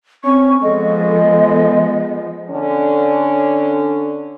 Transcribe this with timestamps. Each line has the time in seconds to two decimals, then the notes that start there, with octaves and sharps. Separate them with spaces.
0.25 C4 C#4 C#6
0.63 F3 G#3 B3 A4 D#5
2.49 D3 C#4 D4